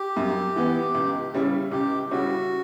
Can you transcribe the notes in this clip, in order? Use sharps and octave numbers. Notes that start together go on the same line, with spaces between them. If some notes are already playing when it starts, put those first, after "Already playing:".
Already playing: G4
F#2
E3 B3
C#2
C#3 G3 C#4 E4
C#2 G4
C#3 G3 C#4 E4 F#4